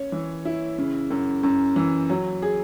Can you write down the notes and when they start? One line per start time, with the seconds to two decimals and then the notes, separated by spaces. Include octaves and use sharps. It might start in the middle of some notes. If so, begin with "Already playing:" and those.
Already playing: C#4 C#5
0.12 E3
0.45 E4
0.78 C#3
1.10 F#2
1.43 F#2
1.76 E3
2.10 F#3
2.42 G#4